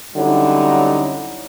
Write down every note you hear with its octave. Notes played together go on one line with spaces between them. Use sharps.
D3 F#3 G3 C#4 D#4 E4